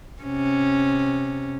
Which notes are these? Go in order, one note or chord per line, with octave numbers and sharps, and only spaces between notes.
C3 C#4